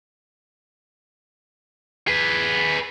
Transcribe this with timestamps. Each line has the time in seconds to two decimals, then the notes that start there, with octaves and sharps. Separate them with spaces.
2.08 G#4 B4